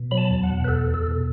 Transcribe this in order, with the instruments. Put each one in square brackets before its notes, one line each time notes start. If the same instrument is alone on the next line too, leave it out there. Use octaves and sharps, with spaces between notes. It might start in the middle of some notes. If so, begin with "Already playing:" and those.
Already playing: [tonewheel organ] B2
F#3 B5
A5
E2
F#5
B2
B4
E2 A4
E2
A4
B2